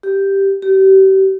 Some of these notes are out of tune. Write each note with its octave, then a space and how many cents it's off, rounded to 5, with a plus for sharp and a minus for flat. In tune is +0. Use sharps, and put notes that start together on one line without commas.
G4 +0
G4 -35